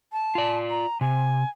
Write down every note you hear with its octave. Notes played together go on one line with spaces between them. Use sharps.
A5
F4 D5
A#5
C3 G#5